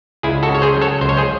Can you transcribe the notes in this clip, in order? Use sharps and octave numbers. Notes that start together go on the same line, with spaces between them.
C#2 E4 G#4
F#4 A4
C#3 C#5
G#4 C5
F#3
A4 C#5
C#2 C5
C#5
G#4 C5